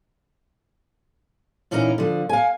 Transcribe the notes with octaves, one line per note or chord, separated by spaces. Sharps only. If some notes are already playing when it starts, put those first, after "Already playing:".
A#2 E3 C#4 D#4 A#4 A#5
D3 F3
F5 G#5